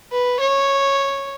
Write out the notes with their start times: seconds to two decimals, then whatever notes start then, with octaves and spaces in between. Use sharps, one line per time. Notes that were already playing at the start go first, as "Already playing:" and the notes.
0.12 B4
0.41 C#5